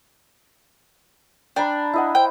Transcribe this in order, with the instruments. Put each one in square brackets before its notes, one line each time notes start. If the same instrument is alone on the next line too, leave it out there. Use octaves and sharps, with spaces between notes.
[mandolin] D4 [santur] G5 A#5 B5
[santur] E4 D#5 F#5
[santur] C5 [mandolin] G5